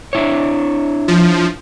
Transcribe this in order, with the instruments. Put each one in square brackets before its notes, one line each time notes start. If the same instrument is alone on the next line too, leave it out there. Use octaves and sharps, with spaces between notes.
[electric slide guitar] D4 E4 C#5
[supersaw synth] F3